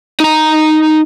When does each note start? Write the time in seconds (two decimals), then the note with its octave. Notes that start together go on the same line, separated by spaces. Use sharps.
0.20 D#4 A#5